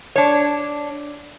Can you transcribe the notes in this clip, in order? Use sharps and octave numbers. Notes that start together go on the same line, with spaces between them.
D4 C#5